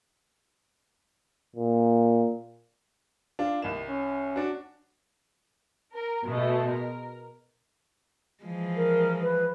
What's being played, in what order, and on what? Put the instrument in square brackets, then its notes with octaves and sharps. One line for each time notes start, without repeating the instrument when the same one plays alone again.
[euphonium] A#2
[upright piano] D4 [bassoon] F4
[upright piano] C2 E7 [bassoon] D#3
[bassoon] C#4
[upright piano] D4 F#4
[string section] A#4
B2 G#3 A3
A#4
[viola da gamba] E3 F3 G#3
[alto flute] A#4
B4